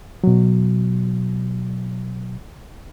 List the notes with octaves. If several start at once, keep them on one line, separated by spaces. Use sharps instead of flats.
B2 F#3